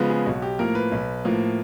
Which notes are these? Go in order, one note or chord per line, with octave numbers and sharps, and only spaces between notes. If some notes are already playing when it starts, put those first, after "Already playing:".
Already playing: C#3 F3 G#3 B3
G#4
B1 F#4
G4
A2 F3 A#3 A#4
B4
B1
A2 F3 A#3